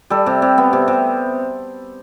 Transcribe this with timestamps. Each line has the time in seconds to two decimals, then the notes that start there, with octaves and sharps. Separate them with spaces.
0.10 G3 A4
0.26 C3
0.42 C3
0.58 B3
0.73 C3
0.88 C3